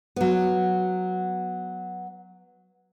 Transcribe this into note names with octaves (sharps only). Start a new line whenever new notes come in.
F#3 B3